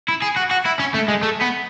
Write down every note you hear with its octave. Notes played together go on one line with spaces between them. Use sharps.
E4
G#4
F#4
F#4
E4
C#4
A3
G#3
A3
B3